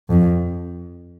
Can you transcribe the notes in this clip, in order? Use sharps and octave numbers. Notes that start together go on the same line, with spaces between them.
F2